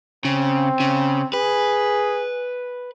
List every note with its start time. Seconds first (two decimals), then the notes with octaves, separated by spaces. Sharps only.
0.25 C#3 C4
0.80 C#3
1.33 G#4 B4